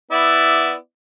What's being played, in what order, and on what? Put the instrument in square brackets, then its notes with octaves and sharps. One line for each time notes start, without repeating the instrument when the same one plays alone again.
[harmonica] B3 E4 D5